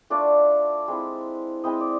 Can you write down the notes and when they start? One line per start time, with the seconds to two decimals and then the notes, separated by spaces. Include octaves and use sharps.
0.10 A3 D4 F4 D5
0.88 G#3 C4 E4
1.64 G#3 C4 E4 D#5
1.80 D5